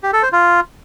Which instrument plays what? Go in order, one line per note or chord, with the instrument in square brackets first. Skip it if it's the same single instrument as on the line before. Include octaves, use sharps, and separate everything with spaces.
[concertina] G4
A4
C5
F4